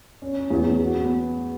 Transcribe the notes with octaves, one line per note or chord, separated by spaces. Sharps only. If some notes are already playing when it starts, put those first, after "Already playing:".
C#4
C#4
E2
E2
F#4
B3